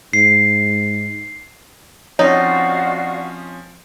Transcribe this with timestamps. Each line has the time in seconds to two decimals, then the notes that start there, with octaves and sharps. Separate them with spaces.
0.13 G#2 C7
2.19 F3 C4 C#4 D#4 F#4 C#5 D5 F5